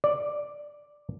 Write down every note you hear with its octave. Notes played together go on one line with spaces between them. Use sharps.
D5